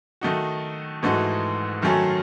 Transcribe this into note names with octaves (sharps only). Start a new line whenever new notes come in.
D#3 A3 D#4 F#4
G#2 E3 A3 D#4 F#4
F#2 D#3 F#3 A3 C#4